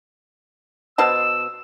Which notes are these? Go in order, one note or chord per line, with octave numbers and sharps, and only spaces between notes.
B2 C5 A5 E6